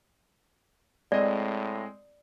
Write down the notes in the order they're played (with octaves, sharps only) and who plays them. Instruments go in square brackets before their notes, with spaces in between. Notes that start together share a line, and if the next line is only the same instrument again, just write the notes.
[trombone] A2 [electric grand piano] G#3 C4 D#5 [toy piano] D5